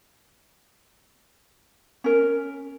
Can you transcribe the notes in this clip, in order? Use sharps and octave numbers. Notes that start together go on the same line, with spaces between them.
C#4 A#4